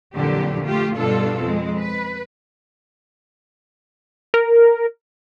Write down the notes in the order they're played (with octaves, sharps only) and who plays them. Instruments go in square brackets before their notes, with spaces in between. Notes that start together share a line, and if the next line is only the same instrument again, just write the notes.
[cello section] F2 A#2 D3 E3 F#3 G4
A3 F4 G4
G2 B2 G3 D4 F4 A4
F2 G#3 C4
B4
[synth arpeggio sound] A#4